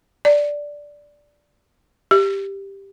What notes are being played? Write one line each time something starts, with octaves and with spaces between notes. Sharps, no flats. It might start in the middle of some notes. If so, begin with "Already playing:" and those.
D5
G4